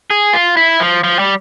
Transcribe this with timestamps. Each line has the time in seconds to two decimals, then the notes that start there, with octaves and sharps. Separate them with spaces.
0.11 G#4
0.33 F4
0.57 E4
0.80 F3
1.04 F3
1.19 G3